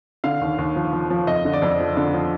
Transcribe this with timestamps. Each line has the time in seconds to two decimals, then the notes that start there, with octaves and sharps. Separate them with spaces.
0.24 D3 F5
0.41 D#2
0.58 D#2
0.76 F3
0.93 F3
1.10 F3
1.27 F2 D#5
1.45 D3
1.53 D5
1.62 F2
1.80 F3
1.97 D3
2.14 F3